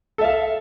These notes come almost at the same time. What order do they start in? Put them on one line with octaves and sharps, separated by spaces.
A4 E5 F5